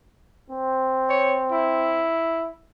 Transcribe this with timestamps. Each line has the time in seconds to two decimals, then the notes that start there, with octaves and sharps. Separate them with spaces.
0.50 C4
1.09 C#5
1.52 E4